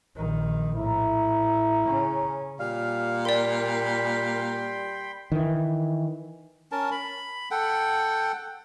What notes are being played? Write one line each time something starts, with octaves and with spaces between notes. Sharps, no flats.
A#1 D#3
A2 E4 A#5
C#3 C#4
A#2 G3 F5
A#4 D5 G5 B5 C6
D#3 E3
C#4 A#4 A5
B5
A4 F#5 G5